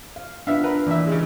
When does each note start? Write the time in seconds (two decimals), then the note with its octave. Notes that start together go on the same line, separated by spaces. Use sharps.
0.16 F5
0.47 B3 D4 F4 E5 F5
0.64 A#4 B4
0.86 A#2 E3 E5
1.07 C#3 G#3